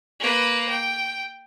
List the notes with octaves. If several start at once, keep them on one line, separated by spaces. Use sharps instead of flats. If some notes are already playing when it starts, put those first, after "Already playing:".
A#3 B4
G5